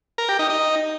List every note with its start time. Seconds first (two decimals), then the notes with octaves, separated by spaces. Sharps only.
0.18 A#4
0.29 G4
0.39 D#4
0.50 D#4